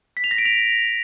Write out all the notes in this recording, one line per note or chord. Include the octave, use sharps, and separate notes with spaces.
B6
F7
A#6
D7
F7